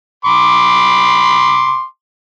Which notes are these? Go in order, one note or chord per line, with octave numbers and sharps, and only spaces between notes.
B5 C6 D6